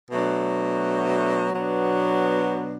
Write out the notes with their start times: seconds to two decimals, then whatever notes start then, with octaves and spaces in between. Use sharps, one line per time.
0.11 B2 F#3 A3 D4
1.53 B2 F#3 B3 D4